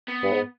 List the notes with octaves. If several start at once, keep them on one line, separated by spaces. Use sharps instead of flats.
B3
G2
G#2